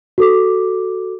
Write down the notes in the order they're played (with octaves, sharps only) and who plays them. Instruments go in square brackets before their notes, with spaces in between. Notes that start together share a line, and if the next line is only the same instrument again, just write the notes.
[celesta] F#4 A4 D6